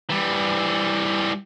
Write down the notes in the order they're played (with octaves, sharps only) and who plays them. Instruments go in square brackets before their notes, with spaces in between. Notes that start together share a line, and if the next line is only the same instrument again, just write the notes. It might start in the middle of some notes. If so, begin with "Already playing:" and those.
[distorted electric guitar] E3 G3